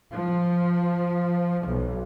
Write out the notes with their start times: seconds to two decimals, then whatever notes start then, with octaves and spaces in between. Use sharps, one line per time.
0.12 F3
1.66 B1